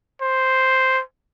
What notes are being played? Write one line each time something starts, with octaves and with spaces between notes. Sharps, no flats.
C5